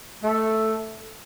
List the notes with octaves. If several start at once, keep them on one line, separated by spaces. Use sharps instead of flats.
A3